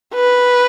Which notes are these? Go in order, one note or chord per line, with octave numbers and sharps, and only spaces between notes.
B4